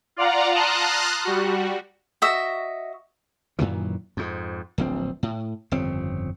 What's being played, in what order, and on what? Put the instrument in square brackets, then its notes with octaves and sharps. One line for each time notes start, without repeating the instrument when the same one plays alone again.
[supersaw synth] F4 D5 F5 F#5 A#5
A5 A#5 C6 D#6 F6 F#6
G3 F#4
[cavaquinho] F#4 D#5 E5
[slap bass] F#2 A#2 D#3 E3
F2 G#2
D1 A#1 C4
A2
G1 F2 C#3 C4